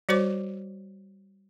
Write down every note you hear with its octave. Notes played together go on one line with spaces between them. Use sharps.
G3 F#4 C5 C#5 D6